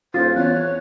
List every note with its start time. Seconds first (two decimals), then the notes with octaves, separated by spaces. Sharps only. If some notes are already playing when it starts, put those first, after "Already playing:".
0.14 D#1 F4 C5 A6
0.36 E2 C#5 F#6